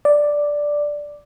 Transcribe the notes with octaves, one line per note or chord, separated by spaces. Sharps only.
D5